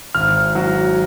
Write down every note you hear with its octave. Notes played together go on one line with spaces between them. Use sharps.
G#1 F6
F#3